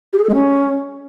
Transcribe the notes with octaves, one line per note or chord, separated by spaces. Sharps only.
G4
G#4
A4
G#3
C#4